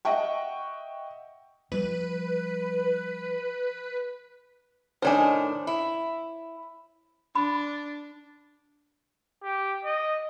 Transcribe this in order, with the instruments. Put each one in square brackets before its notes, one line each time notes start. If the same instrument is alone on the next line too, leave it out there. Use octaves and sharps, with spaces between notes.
[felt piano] D#5 E5 F#5 G5 C#6
[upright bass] F3 G3 [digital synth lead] B4
[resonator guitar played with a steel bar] A2 D#3 D4 [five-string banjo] C5 C#5 G#5
[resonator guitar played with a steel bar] E4
[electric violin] D4 [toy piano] B5
[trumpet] G4
D#5